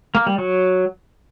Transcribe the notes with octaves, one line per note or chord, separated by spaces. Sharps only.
A#3
G3
F#3